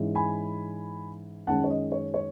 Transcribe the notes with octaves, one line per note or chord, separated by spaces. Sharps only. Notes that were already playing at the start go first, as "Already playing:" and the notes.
Already playing: G#2 E3 G#3 C#4
G#5 B5
F#2 D#3 G#3 C#4 F#5 A5
C#5
D#5
C#5
C#5